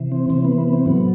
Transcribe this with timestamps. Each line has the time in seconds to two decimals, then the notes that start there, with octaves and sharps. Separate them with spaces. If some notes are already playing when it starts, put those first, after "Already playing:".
Already playing: C3 E3
0.12 C4
0.30 C3 E3 C4
0.45 B3
0.58 B3
0.73 C4
0.86 A2 F#3 B3